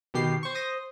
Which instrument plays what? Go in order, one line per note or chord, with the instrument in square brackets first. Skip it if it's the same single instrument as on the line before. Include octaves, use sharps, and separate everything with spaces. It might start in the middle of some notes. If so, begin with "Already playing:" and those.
[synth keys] B2 D#3 G4 C7
C5 C#6
C5 D#6 A#6